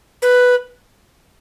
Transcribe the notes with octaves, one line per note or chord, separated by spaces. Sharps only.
B4